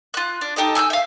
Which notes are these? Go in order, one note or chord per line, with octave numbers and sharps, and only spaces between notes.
F4 F#6
D4
D#4 G4 A4 D#5
G#5 E6 F#6 G6
E5 F5